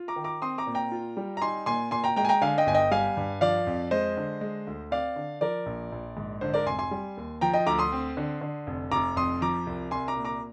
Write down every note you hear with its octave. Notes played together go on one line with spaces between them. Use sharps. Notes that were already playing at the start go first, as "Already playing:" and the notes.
Already playing: F4
A#5 D6
D#3
A#5 D6
C4 C6 D#6
A#5 D6
A#2
G5 A#5
F4
G3
A#5
D#4 G#5 C6
A#2 G#5 C6
A#2 G#5 C6
G5 A#5
G#3 G5 A#5
G#5
G5 A#5
D3 F5 G#5
D#5 G5
G1 G#5
D#5 G5
G3 F5 G#5
G2
F3 D5 F5
F2
G#3 C5 D#5
D3
G#3
D2
C4 D5 F5
D3
F3 A#4 D5
A#1
A#1
G#2
D3 C5
A#4 D5
F1 G#5 C6
G#5 C6
G3
D#2
F3 G5 A#5
D#5 G5
D2 A#5 D6
C6 D#6
C4
D3
D3
F1
F1 A#5 D6
F2 C6 D#6
F3 A#5 D6
C2
C2 G#5 C6
A#5 D6
A#2
A#5 D6